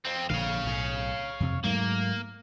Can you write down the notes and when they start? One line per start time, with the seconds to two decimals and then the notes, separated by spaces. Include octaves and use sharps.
0.05 F2 C4
0.30 A#1 D3 C#5 F5
0.65 B1 A2
1.40 F2 C3
1.64 G#2 F#3 A3 A#3